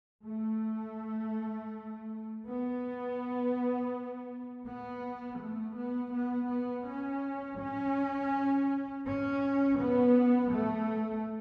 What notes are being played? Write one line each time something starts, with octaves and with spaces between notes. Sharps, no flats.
A3
B3
B3
A3
B3
B3
B3
C#4
C#4
C#4
B3
A3